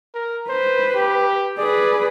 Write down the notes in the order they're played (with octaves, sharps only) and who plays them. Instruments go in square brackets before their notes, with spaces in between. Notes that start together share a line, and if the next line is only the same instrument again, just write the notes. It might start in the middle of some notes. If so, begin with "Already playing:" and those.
[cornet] A#4
[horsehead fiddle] B4 [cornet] C5
[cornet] G4
[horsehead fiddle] G#4 B4 [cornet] D5